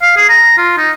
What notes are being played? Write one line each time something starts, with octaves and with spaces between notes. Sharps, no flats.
F5
G#4
A#5
F4
D#4